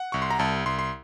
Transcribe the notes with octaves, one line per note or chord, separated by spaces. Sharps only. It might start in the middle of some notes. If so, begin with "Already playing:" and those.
Already playing: F#5
C2 C#6
C6
A#5
C2 A5
C2 C6
C6